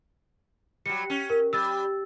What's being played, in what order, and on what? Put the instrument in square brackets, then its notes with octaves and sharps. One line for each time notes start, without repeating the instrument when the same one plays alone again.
[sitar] F#3 G3 [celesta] C#7
[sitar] C#4
[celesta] A#4
[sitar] G3 [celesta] E6 A6